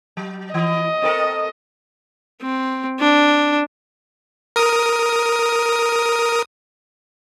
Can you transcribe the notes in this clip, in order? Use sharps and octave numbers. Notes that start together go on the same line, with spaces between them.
F#3
E3 D#5
C4 A4 A#4
C4
D4
A#4 D#6